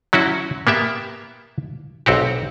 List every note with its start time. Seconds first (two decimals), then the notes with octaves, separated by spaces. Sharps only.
0.13 F#3 C#4 E4 F#4
0.67 A#3 B3 G4 E5
2.06 B1 C4 F#4 G4